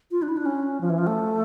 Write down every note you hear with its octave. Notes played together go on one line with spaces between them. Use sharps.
F4
D4
E4
D4
C#4
F3
E3
F3
A3